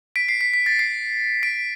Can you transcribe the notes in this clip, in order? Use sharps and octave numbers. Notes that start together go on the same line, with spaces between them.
B6 D7
C7
B6
B6
A6
C7
B6 D7